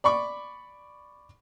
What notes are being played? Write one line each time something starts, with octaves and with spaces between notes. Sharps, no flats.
D5 B5 C#6 D6